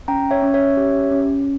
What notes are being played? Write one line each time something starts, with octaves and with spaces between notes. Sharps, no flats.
C#4 G5 A#5
C#5 E5
C#4
C#5 E5
G4
C#4